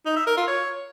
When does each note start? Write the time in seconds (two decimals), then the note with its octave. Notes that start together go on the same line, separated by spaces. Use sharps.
0.06 D#4
0.16 E5
0.27 A#4
0.37 F4
0.48 C#5